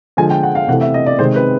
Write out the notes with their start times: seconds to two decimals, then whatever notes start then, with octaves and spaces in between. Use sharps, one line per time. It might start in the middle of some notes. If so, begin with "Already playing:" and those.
0.17 D3 F3 G#3 G#5
0.30 G5
0.43 F#5
0.55 F5
0.68 C3 E3 A3 F#5
0.81 E5
0.94 D#5
1.06 D5
1.19 C3 D#3 G#3 C5
1.36 B4